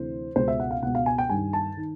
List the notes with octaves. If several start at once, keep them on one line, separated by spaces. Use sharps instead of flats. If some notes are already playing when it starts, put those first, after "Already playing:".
Already playing: D2 C3 E3 C5
C#2 B2 C5
E5
F#5
F5
C#2 B2 F#5
F5
G#5
G5
G2 D#3 G#5
A5
D#3